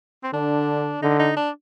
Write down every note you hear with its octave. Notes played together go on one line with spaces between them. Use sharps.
C4
D3 D4
D3 D#4
D#4
D4